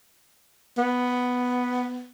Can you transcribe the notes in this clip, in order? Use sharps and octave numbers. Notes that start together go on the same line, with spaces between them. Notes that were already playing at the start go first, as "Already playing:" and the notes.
B3